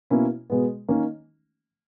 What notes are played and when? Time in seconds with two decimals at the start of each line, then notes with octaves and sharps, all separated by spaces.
0.10 B2 A#3 C#4 E4
0.50 B2 G#3 B3
0.88 D#3 A#3 C#4